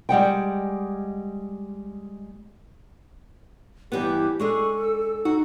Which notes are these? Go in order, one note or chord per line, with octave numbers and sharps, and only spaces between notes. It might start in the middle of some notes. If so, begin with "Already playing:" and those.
G3 G#3 F#5 G5
G2 E3 B3 G4
G#3 D4 G#4 A4 C#6
E6
D#4 F#4